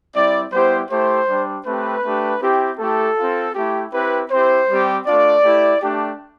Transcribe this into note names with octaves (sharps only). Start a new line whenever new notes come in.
G3 C4 E4 D5
G3 B3 E4 G4 C5
A3 E4 G4 C5
G3 D4 G4
A3 C4 G4 B4
A3 D4 G4
C4 E4 G4
A3 E4 G4 A4
C4 F4
A3 E4 G4
C4 E4 G4 B4
C4 E4 G4 C5
G3 C4 G4
A3 D4 F4 D5
A3 E4 G4
A3 D4 G4